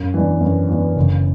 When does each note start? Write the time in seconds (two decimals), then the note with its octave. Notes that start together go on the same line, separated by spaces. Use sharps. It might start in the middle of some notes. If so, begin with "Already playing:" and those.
Already playing: F#2
0.14 E3 B3 D4
0.40 F#2
0.69 E3 B3 D4
0.96 F#1